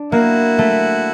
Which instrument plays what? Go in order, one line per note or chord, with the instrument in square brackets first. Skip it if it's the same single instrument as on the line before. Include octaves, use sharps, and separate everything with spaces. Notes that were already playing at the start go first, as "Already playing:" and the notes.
Already playing: [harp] D4
[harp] A#3 [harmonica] E4 F#4
[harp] A3